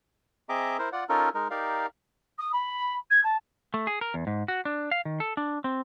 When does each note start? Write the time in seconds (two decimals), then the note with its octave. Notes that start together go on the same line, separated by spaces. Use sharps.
0.49 C4 G#4 D#5 E5 A#5 D6
0.79 E4 A#4 C5
0.92 F4 D5 F#5
1.09 C#4 D#4 F4 A4 A#4
1.35 G#3 D#4 A#4
1.51 D#4 G4 A#4 D5 F5
2.38 D#6
2.52 B5
3.10 G#6
3.23 A5
3.74 A3
3.87 G#4
4.01 A#4
4.14 E2
4.27 G#2
4.48 F#4
4.65 D4
4.91 F5
5.05 D#3
5.20 A4
5.37 D4
5.64 C4